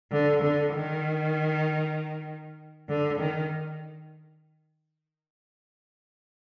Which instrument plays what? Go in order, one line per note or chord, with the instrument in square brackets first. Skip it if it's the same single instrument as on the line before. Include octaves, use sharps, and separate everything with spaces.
[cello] D3
D3
D#3
D3
D#3